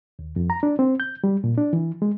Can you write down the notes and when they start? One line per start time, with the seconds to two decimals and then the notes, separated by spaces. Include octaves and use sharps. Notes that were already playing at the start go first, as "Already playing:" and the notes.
0.19 D#2
0.36 F2
0.50 A#5
0.63 D4
0.79 C4
1.00 G6
1.24 G3
1.44 A#2
1.58 D4
1.73 E3
2.02 G#3